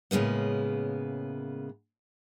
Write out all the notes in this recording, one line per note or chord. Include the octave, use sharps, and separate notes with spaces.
A2 C#3 G#3 A#3 B3